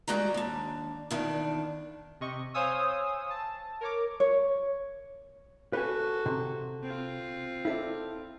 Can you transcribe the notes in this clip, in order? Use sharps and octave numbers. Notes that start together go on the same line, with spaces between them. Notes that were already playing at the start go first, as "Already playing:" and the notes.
G3 G#3 F#4 D5 A#5
D#2 D4
E2 D#3 D4
C3 D#5 C#6
C5 C#5 F5 G#5 D#6 E6
A5
A#4 C#5 D6
C#5
F#4 A4 B4 G#5
C3
C4 F4
E4 A4 D5